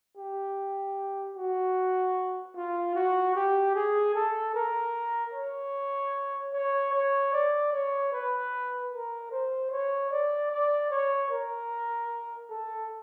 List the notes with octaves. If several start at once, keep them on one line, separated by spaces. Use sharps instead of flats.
G4
F#4
F4
F#4
G4
G#4
A4
A#4
C#5
C#5
C#5
D5
C#5
B4
A#4
C5
C#5
D5
D5
C#5
A#4
A4